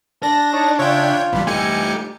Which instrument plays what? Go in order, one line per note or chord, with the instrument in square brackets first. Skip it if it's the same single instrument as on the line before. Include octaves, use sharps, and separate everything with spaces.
[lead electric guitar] D4 [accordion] A5 [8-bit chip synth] A#6
[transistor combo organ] D#4 [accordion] C#5 A5 C#6
[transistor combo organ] C#3 E5 [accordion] F4 [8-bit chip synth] C#5 G5
[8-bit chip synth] A1 G3 [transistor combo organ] D3 B3
[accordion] E3 [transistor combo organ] G3 G4 [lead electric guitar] A3 D#4 [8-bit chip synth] G#5 C#7